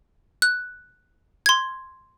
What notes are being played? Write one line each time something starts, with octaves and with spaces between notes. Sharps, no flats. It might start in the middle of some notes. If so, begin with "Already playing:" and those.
F#6
C6 G#6